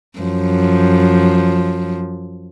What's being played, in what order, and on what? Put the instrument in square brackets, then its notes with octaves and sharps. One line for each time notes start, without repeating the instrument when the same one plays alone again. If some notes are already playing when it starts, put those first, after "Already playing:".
[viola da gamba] F#2 F3